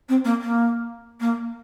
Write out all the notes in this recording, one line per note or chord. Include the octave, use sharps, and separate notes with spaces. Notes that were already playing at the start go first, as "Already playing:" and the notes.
C4
A#3
A#3
A#3